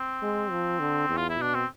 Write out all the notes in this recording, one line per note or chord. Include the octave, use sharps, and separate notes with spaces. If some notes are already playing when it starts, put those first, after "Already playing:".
Already playing: C4
G#3
F3
D3
E2
F4
E4
B2 D4
C4